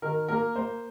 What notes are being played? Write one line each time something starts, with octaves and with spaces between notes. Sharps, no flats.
D#3 A#4
A#3 A#4
A#3 C5